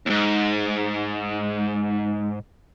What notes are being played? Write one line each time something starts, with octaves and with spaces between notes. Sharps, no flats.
D#2 G#2